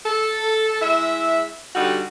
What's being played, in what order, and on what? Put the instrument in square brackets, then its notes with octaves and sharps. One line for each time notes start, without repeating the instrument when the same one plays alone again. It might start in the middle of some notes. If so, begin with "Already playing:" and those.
[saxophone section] A4
G#3 E4 E5
D3 G3 D#4 F#4